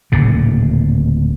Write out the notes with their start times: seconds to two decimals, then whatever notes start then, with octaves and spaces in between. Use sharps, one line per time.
0.12 D1 A#2 C#3